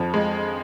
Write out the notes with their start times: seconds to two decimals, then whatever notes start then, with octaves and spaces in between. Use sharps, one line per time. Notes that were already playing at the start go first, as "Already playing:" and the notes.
Already playing: F2 F3
0.14 G#3